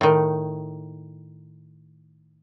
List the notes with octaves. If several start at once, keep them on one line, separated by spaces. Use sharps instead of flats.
A2 D#3